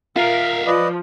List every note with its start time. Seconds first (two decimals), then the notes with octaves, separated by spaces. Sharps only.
0.16 F4 A#4 E5 F5
0.66 F3 B4 D5 D#5